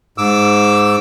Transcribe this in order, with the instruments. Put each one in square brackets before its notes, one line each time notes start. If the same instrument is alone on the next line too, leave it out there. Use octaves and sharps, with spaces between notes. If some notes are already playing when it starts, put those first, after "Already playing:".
[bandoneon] G#2 D6 E6